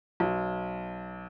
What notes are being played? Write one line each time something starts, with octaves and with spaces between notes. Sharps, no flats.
B1